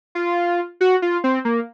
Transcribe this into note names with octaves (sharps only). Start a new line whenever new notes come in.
F4
F#4
F4
C4
A#3